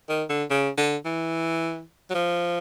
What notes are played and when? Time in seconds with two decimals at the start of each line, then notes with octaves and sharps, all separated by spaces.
0.09 D#3
0.30 D3
0.50 C#3
0.78 D3
1.05 E3
2.10 F#3
2.14 F3